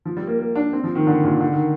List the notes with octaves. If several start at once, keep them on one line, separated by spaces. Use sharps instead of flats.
F3
G3
A#3
A#3
D4
C4
F3
D#3
D3
A#2
D3
D#3